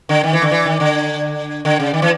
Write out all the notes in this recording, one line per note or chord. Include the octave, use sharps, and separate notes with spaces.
D3
D#3
E3
D3
E3
D#3
D3
D3
C#3
D#3
E3